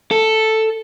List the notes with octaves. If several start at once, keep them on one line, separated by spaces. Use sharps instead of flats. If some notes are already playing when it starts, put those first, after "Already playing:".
A4